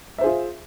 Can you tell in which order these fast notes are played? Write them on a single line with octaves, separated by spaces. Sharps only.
E5 C5 G#4 F4